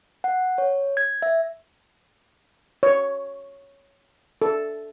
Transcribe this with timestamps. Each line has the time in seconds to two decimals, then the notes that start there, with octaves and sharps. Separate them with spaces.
0.24 F#5
0.58 C#5
0.97 G#6
1.22 E5
2.83 C#5
4.42 A4